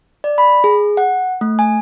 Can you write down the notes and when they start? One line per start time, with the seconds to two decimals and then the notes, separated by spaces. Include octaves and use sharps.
0.24 D5
0.38 B5
0.64 G#4
0.97 F#5
1.41 A3
1.59 G#5